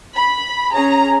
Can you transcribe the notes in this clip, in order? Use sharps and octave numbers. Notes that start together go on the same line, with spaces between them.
B5
C#4 G#4 A#5